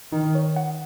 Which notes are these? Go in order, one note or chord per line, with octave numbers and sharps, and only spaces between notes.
D#3 D#4
C#5
F#5